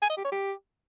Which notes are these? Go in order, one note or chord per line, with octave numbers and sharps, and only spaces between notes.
G#5
D#5
G4
C#5
G4